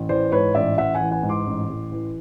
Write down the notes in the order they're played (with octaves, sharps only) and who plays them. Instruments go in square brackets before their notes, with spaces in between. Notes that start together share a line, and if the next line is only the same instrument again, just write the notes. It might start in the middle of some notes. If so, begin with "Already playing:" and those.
Already playing: [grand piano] A1
E3 C5 D5
G#2 B4 C#5
A1 D5 E5
A1 E5 F#5
F#5 G#5
E3
F#5 G#5
G#2
C6 D6
A1
A1
E3